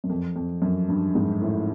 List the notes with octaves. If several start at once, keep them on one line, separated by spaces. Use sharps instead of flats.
F#2
F2
F2
F#2
G2
G#2
A2